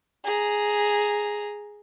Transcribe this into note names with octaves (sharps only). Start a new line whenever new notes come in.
G#4 A#5